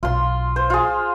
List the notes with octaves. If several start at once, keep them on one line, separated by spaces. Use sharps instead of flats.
B1 F4 C6
C5
F4 G#4